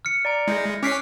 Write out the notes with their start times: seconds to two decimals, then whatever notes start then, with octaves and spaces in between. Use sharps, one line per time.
0.05 F6 C#7
0.25 D5 A#5 D7
0.48 G#3 E4 G6 A#6
0.83 C#4 D6 F#6 B6 C7 D7